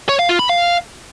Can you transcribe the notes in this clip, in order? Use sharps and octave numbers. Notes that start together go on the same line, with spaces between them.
C#5
F5
F4
B5
F5